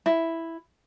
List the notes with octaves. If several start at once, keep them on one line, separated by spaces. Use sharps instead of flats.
E4